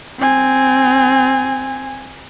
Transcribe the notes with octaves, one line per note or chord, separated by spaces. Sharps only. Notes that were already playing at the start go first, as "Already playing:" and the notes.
C4 G#5